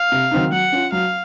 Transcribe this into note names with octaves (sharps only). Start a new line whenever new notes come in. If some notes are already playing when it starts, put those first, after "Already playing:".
Already playing: F5
C3
D#3 F#3 C4 D#4
F#3 F#5
C#4 F4
F#3 F5